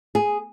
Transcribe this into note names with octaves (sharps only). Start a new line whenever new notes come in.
G#4